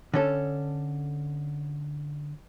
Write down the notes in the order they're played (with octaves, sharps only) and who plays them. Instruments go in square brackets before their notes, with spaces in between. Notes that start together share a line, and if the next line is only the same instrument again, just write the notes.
[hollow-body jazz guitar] D3 C#4 A4